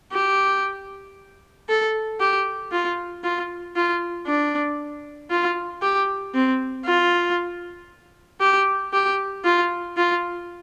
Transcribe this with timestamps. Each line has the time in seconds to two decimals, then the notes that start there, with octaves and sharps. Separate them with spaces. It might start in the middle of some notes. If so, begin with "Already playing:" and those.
0.13 G4
1.69 A4
2.20 G4
2.72 F4
3.24 F4
3.76 F4
4.27 D4
5.30 F4
5.82 G4
6.34 C4
6.86 F4
8.41 G4
8.93 G4
9.45 F4
9.97 F4